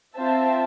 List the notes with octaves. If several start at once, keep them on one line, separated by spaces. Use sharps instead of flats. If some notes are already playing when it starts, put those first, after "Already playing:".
C4 F4 C5 E5 A5